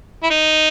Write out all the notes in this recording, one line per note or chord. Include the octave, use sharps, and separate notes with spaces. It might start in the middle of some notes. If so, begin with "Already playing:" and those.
E4
D#4